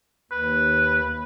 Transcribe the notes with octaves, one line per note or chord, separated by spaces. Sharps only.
D#2 B4